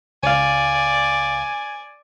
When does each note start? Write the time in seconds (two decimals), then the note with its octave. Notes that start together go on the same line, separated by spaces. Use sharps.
0.23 C#2 D5 F5 G#5